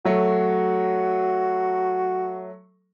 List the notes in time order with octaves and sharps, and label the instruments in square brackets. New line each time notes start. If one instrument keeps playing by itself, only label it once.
[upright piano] F#3 A3 [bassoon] F#4